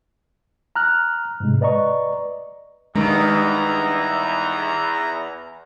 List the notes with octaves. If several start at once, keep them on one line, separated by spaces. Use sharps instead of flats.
A#5 F6 F#6
G#2 C3 G#3
B4 D5 D#5 A#5 C#6
E2 G2 D#3 G#3 A#5